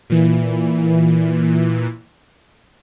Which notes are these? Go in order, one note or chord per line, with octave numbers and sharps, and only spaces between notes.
A#2 E3